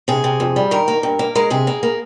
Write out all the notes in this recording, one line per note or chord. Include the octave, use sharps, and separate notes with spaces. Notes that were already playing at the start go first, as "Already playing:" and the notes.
C3 G#4
C3
F2
G3
D#3 A#4
A#3
G2
A#3
G#3 A#4
C3 G#4
A#3
A#3